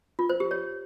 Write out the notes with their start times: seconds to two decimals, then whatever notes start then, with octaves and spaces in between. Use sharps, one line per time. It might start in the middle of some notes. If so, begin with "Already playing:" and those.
0.19 F4
0.30 C5
0.40 G4
0.51 C#5